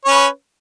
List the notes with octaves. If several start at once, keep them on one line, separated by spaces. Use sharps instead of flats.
C#4 B4 C#5